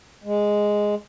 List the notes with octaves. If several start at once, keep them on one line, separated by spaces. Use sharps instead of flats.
G#3